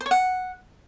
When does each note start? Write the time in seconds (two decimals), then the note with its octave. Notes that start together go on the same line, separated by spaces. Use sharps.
0.01 C5
0.06 C#5
0.11 F#5